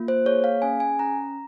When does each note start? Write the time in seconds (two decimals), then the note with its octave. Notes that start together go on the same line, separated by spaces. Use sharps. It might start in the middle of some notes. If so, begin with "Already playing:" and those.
Already playing: A#3 F4
0.08 C5
0.26 G#4 C#5
0.44 F5
0.62 C#4 G#5
0.80 G#5
0.99 C#4 A#5